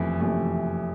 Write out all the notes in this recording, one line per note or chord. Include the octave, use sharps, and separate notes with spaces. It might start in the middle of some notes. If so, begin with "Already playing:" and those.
Already playing: F#1 F2 C3 E3 A3
F#1 F2 C3 E3 A3